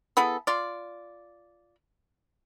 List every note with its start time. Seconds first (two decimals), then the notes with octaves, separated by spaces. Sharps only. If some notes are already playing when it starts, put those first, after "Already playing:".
0.17 B3 E4 G#4 A4
0.47 F4 D5